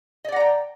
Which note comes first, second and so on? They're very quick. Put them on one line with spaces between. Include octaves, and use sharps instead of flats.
D#5 D5 F#5 A#5 G5